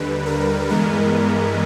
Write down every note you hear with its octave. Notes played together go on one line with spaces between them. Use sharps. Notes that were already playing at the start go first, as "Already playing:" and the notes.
Already playing: D#2 D3 G3 B4
A#4
G2 E3 G#3 B3 A#4